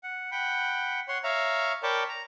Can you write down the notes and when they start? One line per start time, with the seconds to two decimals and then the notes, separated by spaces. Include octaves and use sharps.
0.03 F#5
0.32 F#5 G5 B5
1.08 C#5 F#5 C6
1.24 C#5 E5 F5 A#5
1.83 A#4 C#5 D5 G5 A5 B5
2.08 A#5